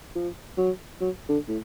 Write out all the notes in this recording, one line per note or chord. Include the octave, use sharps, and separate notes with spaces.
F3
F#3
F#3
D3
A2